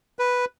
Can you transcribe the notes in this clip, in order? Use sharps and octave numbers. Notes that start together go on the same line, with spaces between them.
B4